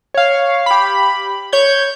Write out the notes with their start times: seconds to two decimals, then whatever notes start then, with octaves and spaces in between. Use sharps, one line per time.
0.14 C#5 F5
0.66 G4 B5
1.52 C#5 G6 G#6